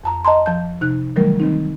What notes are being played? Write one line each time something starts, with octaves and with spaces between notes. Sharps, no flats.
F2 A5 A#5
D#5 A5 A#5 C6
F3 A5 G6
C3 D#4 F#6
D#3 E3 F#3 G3 A3 A#4
D#3 C4 D#4